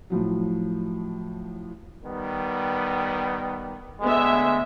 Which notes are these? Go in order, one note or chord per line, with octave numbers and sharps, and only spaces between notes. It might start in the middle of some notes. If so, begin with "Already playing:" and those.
A2 F3 F#3
D#3 G3 B3
D2 G#3 B3 E5